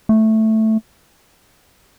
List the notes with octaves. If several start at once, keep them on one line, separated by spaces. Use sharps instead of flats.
A3